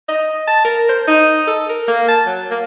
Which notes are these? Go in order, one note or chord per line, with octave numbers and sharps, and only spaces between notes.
D#5
A5
A#4
C5
D#4
A4
A#4
A#3
A5
F#3
A#3